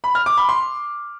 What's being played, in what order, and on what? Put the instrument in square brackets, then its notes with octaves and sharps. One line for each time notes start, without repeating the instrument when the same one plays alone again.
[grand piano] B5
F6
D6
B5
C6